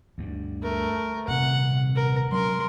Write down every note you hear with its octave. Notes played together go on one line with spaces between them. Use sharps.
D2 G2
A3 A#4
D#1 C3 F#5
A#4
F#3 G#3 C#4 A#4 C6